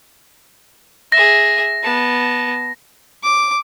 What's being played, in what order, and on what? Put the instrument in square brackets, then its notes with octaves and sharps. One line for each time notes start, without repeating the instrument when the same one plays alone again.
[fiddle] G#4 E5 [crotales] A#6
[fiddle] B3 A5
[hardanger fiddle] D6